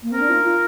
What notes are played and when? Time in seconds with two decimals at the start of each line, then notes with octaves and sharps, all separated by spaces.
0.03 A#3
0.12 C4 A#4
0.20 D4
0.29 F4
0.45 F4